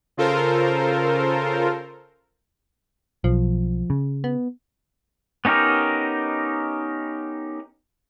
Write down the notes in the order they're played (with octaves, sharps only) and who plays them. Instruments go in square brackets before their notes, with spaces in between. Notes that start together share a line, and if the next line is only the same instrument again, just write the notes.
[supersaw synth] C#3 F4 A4 A#4 C5
[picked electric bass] B1 [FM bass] F3
[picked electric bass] C#3
[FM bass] B3
[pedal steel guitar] B3 C#4 D#4 G4 A#4